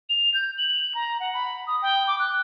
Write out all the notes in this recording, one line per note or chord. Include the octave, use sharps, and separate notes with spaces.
F7
G6
F#7
A#5
F#5
B5
D#6
G5
D6
F#6